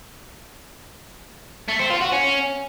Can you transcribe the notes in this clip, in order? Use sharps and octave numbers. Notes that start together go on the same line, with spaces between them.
A3
C4
F4
F#4
C#4